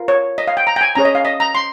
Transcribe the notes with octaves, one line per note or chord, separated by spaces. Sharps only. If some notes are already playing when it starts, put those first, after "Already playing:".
Already playing: F4 A#4
C#5
D#5
F5
G5
A#5
G5
G#5
C#4 G#4 C#5 A#5
D#5
F5
D#5
A#5
C6